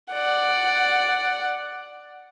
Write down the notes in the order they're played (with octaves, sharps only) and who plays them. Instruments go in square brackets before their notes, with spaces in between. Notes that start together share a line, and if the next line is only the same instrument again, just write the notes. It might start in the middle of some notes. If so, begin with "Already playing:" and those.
[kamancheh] D5 F#5